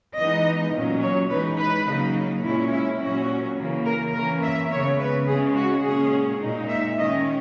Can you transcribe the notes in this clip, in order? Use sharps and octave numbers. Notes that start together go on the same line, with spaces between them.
E3 G#3 B3 D#4 D#5
A#2 F#3 C#4
C#5
E3 G#3 D#4 B4
B4
C#3 F#3 A#3 D#4
A#2 G#3 C#4 E4
E4
A#2 F#3 C#4 F#4
C#3 E3 A#3
A#4
E3 A#3 C#4 A#4
E5
C#3 G#3 B3 C#5
B4
C#3 G#3 C#4 G#4
F#4
A#2 G#3 C#4 G#4
A#2 G#3 D#4
E5
D#3 G#3 C#4 D#5